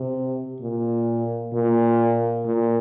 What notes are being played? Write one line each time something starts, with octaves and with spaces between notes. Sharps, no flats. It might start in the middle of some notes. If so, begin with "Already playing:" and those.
Already playing: C3
A#2
A#2
A#2